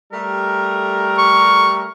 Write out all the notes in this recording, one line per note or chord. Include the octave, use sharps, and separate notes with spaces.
G3 A3 A#4
C#6